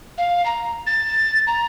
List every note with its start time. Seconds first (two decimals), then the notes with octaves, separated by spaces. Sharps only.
0.18 F5
0.45 A#5
0.87 A6
1.47 A#5